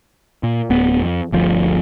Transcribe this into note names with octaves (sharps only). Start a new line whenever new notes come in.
A#2
D1 B3
F2
G1 D2 F3